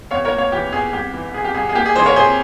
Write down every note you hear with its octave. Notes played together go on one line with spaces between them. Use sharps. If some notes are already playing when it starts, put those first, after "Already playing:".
E2 C#5 F5
A#4 C#5
A#3
C#5 F5
E3 G4
E2 G#4
C2 G4
E3
C3 G#4
G4
C2 G#4
G#4
A#3 G4
G#4
E3 G#4 C5
A#4 C#5
C3 G#4 C5